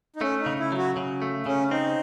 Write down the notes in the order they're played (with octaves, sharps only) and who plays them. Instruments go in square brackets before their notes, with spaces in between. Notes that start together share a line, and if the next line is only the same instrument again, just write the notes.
[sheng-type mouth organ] D#4
[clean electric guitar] A3 [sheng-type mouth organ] C#4
[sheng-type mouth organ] D#4
[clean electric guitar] C#3
[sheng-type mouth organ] E4
[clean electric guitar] F#3
[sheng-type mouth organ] F#4
[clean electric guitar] C#3
A3
[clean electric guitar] C#3 [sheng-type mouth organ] C#4
[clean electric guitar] C4 [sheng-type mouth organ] D#4